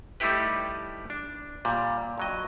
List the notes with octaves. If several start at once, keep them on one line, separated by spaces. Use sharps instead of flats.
G3 A3 D#4 E4 G4 B4
D4
A#2 G3
G2 F#3 D#5